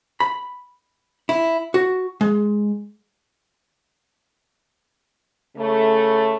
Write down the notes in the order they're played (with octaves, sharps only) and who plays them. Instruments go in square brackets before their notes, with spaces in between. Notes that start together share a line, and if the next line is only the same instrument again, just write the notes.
[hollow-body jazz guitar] B5
E4
F#4
G#3
[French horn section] C#3 A3